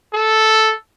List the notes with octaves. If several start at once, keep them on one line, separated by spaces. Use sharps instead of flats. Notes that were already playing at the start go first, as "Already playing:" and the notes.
A4